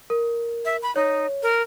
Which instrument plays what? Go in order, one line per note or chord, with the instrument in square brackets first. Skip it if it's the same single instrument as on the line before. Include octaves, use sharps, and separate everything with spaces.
[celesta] A#4
[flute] E5
B5
[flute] D#4 [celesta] C#5
[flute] A#4